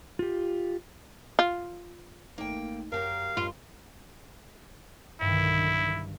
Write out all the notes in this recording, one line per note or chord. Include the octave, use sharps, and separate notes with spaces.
F4 G4
F4
G#1 A3 A#3 D#4 G5
F#2 F#3 G4 A#4 F5
F#2 F4
B1 G2 D3 D#3 E4